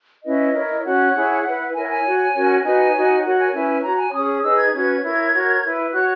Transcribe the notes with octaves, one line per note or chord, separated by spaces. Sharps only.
C#4 E4 B4 D#5
E4 A#4 C#5
C#4 F#4 C#5 F#5
E4 G#4 C#5
E4 B4
E4 A#4 C#5 G#5
F#5
G#5
F#4 C#5
C#4 F#4 A#4 C#5
D#4 F#4 B4 G#5
D#4 F#4 C#5
F#4 A#4 C#5 F#5
G#5
C#4 E4 B4 G#5
F#4 C#5 A#5
G#5
C#4 G#4 C#5 D#6
D#4 G#4 B4 E6
G#6
C#4 F#4 B4 G#6
E4 A#4 C#5
F#4 A#4 C#5
E4 B4
F#4 C#5 F#6